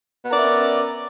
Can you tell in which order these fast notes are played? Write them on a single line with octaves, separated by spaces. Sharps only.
B3 A#4 D5 E5 C#4